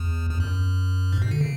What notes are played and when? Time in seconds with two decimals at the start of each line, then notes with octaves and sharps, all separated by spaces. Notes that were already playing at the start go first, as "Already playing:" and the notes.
Already playing: E2
0.31 E2
0.40 F#2
1.13 G#2
1.22 B2
1.31 D3
1.41 C#3